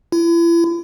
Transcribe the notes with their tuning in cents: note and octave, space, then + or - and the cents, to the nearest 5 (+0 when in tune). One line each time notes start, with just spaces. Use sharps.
E4 +40